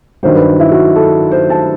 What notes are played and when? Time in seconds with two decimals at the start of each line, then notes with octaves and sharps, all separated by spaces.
0.23 G2 D#3 F#3 C5
0.36 B4
0.60 E4
0.72 F#4
0.96 A4
1.32 C5
1.50 A5